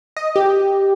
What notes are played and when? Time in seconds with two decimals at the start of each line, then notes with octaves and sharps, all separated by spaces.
0.17 D#5
0.36 G4